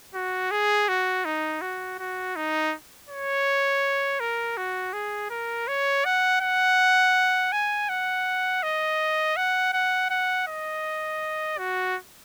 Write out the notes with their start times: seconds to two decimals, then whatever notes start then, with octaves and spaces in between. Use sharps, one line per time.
0.14 F#4
0.51 G#4
0.88 F#4
1.25 D#4
1.62 F#4
1.99 F#4
2.36 D#4
3.09 C#5
4.20 A#4
4.57 F#4
4.93 G#4
5.30 A#4
5.68 C#5
6.05 F#5
6.41 F#5
7.52 G#5
7.89 F#5
8.63 D#5
9.37 F#5
9.73 F#5
10.10 F#5
10.47 D#5
11.58 F#4